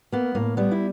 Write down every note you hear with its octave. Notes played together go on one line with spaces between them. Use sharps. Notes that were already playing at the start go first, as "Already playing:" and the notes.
A#3 B3
A2 A#3
G3 B3
E4